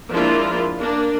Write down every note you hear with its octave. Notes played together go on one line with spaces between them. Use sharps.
F3 G#3 A#3 D4 E4 F4
A#3 D4